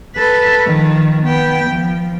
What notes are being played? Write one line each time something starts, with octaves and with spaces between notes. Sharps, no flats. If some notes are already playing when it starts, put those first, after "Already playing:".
A4 B4
D#3 F3
B3 G5
F3